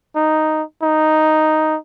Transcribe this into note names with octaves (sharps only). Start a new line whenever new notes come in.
D#4
D#4